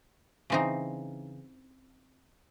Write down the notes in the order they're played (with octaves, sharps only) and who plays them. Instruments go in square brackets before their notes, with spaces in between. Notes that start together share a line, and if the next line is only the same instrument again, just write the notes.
[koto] C#3 E3 C4 D#4